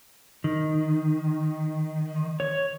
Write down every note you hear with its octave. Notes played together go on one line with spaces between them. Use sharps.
D#3
C#5